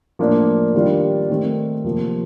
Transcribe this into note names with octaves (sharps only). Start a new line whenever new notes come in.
A2 F3 A#3 D4
D#3 G3 D4 F4
D#3 A3 C4
C3 F3 A#3